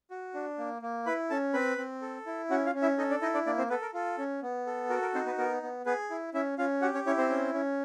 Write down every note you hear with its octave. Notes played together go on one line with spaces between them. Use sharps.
F#4
D4
A#3
A#3
E4 B4 B5
C#4 A4 A5
C4 B4 B5
C4
A4
E4
C#4 F#4 F#5
F4 F5
C#4
E4 E5
D#4 A4 D#5
D4 D5
D#4 E4 D#5
D4 D5
A#3 D4 D5
C4 C5
B3 A4 B4
A#4
F4 A4
C#4
B3
A4
F#4 A#4
A#4
C4 D#4 C5
B3 B4
B3 A#4
B3
B3 G#4 B4
E4
C#4 E4 E5
C#4 F4 F5
F#4 G4 F#5
C#4 C#5
C#4 E4 C#5
C4 C5
C#4
C#4